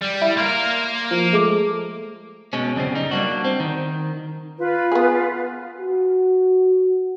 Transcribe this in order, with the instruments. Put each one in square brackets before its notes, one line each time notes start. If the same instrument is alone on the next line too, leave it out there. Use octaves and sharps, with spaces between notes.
[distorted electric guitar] G3
[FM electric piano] E4
[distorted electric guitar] A#3 A#4 [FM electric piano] C6
[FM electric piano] F3
G#3 A3 D6
[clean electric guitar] B2 G#3 C#4
F#2 C#3 G3 C4
G3 D#4
G3 A#3 C#4 D4 F#4
C4
D#3
[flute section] F4 B4
[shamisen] B3 G#4
[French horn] F#4